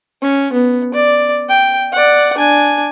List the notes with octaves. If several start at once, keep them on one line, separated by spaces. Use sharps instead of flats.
C#4
B3
D5
G5
D5 F#5
D4 G#5